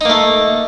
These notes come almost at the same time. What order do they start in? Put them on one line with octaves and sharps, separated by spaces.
D#4 A#3 A3